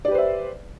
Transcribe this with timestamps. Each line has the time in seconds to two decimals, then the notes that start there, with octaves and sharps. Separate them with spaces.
0.05 D5
0.08 G4
0.11 B4
0.15 C5
0.18 E5